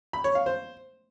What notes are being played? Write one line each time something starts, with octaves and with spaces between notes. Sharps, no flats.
B5
C#5
F5
C5